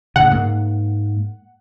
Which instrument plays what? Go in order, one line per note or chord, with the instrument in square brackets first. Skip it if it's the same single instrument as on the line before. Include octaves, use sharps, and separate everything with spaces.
[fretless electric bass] A2 C#3 [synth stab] F#5
[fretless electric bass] G#2 A#3